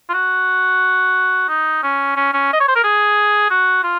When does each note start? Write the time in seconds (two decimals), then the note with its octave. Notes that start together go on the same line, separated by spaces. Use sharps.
0.09 F4
0.14 F#4
1.49 D#4
1.83 C#4
2.16 C#4
2.33 C#4
2.53 D#5
2.60 C#5
2.68 C5
2.75 A#4
2.84 G#4
3.50 F#4
3.84 F4